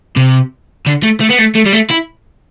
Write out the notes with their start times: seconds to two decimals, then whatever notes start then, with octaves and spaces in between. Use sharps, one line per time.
0.17 C3
0.87 D3
1.03 A3
1.21 A3
1.30 B3
1.39 A3
1.55 A3
1.66 G3
1.73 A3
1.91 E4